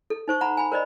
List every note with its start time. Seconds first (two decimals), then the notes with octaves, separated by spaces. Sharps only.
0.10 A4
0.28 D#4 C5 C#6
0.41 F#5 A#5 B5
0.57 G#5 B5
0.72 A#4 C5 D5 D#5 B5